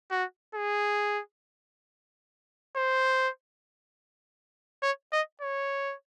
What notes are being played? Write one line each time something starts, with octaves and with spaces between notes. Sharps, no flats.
F#4
G#4
C5
C#5
D#5
C#5